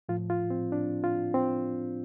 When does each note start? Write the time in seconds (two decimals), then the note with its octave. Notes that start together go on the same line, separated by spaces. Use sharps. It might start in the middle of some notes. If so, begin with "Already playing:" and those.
0.09 A2 F3 F4
0.30 F4
0.50 C4
0.72 D4
1.04 F4
1.34 C4